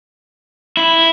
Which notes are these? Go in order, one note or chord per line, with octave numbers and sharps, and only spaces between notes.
E4